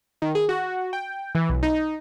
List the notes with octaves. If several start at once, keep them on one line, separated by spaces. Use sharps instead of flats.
D#3
G#4
F#4
G5
E3
B1
D#4